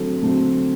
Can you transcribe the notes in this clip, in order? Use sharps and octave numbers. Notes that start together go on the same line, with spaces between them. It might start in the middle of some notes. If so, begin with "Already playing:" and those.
Already playing: D3 F#3 A3 C4
D3 F#3 A3 C4